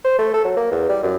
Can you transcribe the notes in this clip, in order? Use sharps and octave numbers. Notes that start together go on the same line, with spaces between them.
C5
A3
A4
F#3
A#3
E2
G3
F#2